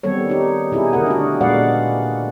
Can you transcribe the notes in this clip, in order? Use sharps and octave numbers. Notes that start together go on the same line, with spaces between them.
D#3 G3 B3 C4 A4 C#5
D#4 G4
B2 D#4 E4 G4 G#4
D3 A3 A#4 F#5
D4 F#4
A#2 G#3 B4 D5 F5 F#5